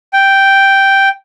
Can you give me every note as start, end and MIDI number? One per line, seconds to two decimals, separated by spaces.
0.13 1.09 79